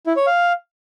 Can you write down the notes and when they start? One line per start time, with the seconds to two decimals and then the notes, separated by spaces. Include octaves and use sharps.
0.06 E4
0.17 C#5
0.27 F5